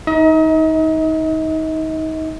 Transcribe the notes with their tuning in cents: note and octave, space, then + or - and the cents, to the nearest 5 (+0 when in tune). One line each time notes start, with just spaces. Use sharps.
D#4 +20 D#5 +40